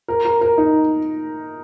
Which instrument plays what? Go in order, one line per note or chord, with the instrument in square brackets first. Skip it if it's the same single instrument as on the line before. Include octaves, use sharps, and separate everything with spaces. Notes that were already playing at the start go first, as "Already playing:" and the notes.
[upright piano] A#4
A#4
A#4
D#4